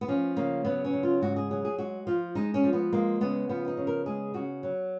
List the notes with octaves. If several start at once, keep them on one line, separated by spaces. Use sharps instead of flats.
B3
F3 C#4
C#3 A#3
F#3 B3
C#4
C#3
F4
G#2 F#4
G#4
F#3 G#4
G#4
G#3 F#4
F3 F4
G#3 D#4
C#4
F3
B3
G#3 A#3
C#3 B3
F3 B3
D#4
C#3
A#4
G#3 G#4
C#3 F#4
F#3